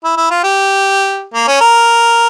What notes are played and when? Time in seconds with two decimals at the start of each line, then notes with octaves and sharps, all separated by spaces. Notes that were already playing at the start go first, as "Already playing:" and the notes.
0.04 E4
0.17 E4
0.31 F4
0.43 G4
1.34 A#3
1.48 C#4
1.61 A#4